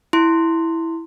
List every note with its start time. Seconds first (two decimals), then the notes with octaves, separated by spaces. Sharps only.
0.13 E4 C6